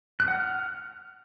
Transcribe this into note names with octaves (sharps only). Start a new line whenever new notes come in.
F#6
F#5
F6